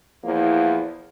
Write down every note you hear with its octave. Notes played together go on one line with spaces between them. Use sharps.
E2 A#2 F3 A#3 E4